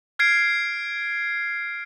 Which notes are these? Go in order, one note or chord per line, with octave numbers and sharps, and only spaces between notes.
F6 G#6 C7 D7